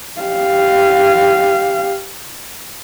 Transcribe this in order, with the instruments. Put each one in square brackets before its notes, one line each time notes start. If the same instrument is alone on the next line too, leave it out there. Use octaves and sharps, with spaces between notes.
[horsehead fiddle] G4 F5